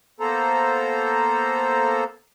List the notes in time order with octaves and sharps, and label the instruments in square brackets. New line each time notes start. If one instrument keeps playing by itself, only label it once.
[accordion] A#3 B3 A4 C5 A#5